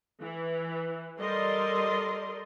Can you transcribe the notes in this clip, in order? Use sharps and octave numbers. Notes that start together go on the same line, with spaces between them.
E3
G3 A4 A#4 D5 D#5 C6